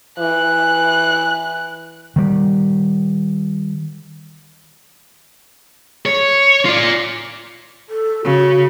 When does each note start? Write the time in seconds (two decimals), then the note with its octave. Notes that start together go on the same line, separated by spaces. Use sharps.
0.19 E3 F#6
2.16 D#3 G3
6.06 C#5
6.65 F4 D5
7.89 A4
8.25 C#3 F#4